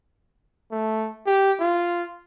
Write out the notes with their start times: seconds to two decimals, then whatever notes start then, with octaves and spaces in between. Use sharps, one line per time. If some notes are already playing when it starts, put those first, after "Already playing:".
0.71 A3
1.27 G4
1.60 F4